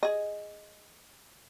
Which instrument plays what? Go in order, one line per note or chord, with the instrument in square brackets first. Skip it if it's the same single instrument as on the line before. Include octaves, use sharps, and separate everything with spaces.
[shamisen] G#4 D#5